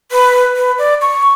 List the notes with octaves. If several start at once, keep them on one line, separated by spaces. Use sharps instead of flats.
B4
B4
D5
C#6